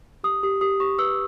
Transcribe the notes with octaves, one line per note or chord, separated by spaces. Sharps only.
G4 D#6
G4 D#6
G4 D#6
G4 C#6
B4 E6